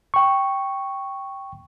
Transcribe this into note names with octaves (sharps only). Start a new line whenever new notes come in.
G5 C#6